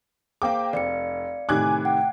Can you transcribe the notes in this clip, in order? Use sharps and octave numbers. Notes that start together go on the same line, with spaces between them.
A#3 G#4 C5 F5 G5 D6
F1 D5 F5 C#7
A2 C3 D#3 G#5 D6 F#6 G#6
F#5 G5